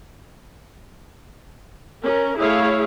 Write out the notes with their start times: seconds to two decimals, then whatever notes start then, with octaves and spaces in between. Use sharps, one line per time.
2.03 C#4 A#4
2.39 A3 E4 G#4 C#5 F5